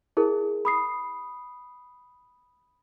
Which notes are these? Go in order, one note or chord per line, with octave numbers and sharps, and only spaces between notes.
E4 G#4 A#4
B5 D#6 C7